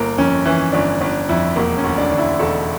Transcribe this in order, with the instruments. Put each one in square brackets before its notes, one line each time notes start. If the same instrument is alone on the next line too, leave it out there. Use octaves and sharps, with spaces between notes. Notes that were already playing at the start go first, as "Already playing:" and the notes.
Already playing: [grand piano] G1 A#3
F2 C#4
E3 C#4
G1 D4
G1 D4
F2 E4
E1 A#3
C#4
D2
D4
D3
E4
E1 A4